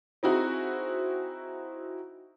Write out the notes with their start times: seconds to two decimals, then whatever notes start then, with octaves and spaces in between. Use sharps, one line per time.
0.23 C4 D#4 E4 F#4 G#4